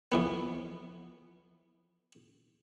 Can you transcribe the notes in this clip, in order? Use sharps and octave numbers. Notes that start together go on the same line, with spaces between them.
F2 E3 B3